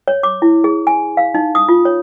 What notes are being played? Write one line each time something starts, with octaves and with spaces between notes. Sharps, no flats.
C#5
D6
E4
G#4
G#5
F5
D#4
D#6
F4
C#5